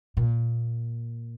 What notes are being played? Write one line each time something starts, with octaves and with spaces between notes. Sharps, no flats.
A#2